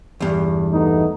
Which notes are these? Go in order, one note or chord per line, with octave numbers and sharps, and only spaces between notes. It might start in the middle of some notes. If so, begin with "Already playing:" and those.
E2 G2
A3 B3 D#4